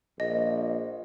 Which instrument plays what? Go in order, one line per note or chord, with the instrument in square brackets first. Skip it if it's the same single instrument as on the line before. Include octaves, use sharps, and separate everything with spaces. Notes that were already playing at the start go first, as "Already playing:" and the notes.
[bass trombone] A#1 [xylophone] D#5